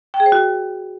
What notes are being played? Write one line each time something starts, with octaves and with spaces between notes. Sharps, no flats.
G5
G#4
C5
F#4